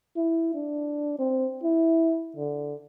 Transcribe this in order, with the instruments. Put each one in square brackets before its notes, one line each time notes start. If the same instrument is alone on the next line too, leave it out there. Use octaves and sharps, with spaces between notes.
[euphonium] E4
D4
C4
E4
D3